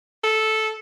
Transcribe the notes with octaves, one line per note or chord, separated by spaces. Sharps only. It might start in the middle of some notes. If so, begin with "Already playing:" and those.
A4